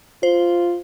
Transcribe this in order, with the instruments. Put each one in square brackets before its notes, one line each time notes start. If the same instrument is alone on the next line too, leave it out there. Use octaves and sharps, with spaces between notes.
[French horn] F4 [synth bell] C5